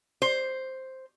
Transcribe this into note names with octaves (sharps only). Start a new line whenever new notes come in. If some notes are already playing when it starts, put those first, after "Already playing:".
C5